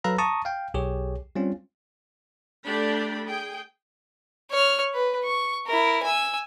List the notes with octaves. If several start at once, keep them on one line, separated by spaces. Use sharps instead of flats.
F#3 A4 B4 F5 A#5 E6
A5 A#5 C#6 D#6
F5 G5
B1 G4 G#4 C#5
G3 C4 C#4 F4
A3 D4 G4 B5
G#4 G5
C#5 F6
B4
C#6
E4 A#4
G#5 E6